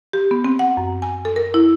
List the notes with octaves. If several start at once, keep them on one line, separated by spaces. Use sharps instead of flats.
G4
B3
C4
F#5
F#2
G#5
A4
A#4
E4